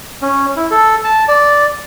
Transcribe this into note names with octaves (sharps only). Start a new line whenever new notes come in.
C#4
E4
A4
A5
D5